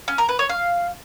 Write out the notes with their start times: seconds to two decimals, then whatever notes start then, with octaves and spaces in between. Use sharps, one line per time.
0.08 C#4
0.18 A#4
0.29 B4
0.39 C#5
0.49 F5